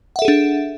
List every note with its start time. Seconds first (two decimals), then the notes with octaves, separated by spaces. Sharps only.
0.16 F#5
0.19 E5
0.22 A4
0.25 G#4
0.28 D4